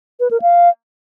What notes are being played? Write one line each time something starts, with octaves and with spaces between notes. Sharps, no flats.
B4
A#4
F5